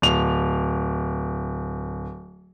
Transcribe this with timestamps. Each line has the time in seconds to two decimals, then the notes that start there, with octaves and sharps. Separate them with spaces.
0.02 D1 F7